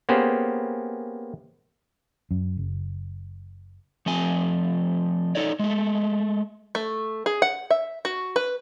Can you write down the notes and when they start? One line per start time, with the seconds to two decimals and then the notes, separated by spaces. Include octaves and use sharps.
0.09 A#3 B3 C#4 G4 G#4 C5
2.31 F#2
2.57 F#1
4.06 F3 A3 C4 G#5
5.35 D#4 A4 C#5 D5
5.59 G#3 A3
6.75 A3
7.26 G#4
7.42 F#5
7.70 E5
8.05 F#4
8.36 B4